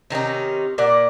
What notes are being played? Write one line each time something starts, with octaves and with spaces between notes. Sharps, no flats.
C3 D#3 C#4 D#4
A#2 A#3 D5 F#5